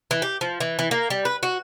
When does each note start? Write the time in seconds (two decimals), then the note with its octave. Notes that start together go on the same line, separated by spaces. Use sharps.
0.11 E3
0.22 G4
0.41 F3
0.60 E3
0.79 E3
0.91 A#3
1.10 G3
1.25 B4
1.43 F#4